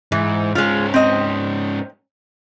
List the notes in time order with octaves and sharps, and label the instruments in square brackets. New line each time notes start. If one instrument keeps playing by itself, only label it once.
[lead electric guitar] G#2 [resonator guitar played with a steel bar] E3
[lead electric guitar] G#2 C#4 [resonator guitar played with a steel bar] G#3 F4
[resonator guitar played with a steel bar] C4 D#5